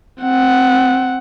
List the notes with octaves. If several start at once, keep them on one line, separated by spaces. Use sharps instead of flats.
C4 F#5